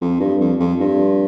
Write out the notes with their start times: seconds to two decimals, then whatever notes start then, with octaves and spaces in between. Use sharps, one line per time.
0.02 F2
0.20 G2
0.41 F2
0.60 F2
0.80 G2